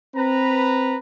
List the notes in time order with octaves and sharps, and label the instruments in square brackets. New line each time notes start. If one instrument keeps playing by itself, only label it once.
[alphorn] C4 [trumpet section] B4 A#5